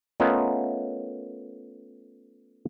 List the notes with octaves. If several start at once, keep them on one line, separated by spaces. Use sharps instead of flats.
A3 B3 C#4 F4 A#4 D#5